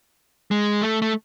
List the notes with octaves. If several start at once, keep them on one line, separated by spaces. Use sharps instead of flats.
G#3
A3
A3